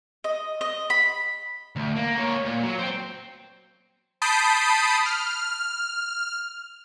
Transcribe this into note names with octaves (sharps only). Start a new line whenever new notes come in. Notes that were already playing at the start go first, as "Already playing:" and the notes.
D#5
D#5
B5
D2
A#3
A#3 C#5
A#2
F#3
C5 G5
A5 B5 D#6 G6 C7 D7
F6